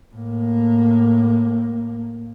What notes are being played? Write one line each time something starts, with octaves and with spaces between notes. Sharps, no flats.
A2 A#3